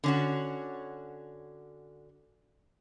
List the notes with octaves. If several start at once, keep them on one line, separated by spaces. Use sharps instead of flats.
D3 C#4 F#4